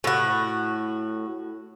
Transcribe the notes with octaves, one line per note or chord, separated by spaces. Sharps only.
A2 F#4